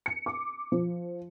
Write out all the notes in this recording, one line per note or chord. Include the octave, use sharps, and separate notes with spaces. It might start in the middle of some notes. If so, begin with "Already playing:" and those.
C#7
D6
F3